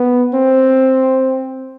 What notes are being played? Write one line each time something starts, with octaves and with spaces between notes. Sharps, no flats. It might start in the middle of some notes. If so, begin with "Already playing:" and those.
Already playing: B3
C4